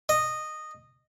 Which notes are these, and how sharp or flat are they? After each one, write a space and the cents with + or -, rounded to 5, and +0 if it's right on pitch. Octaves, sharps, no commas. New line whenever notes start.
D#5 -15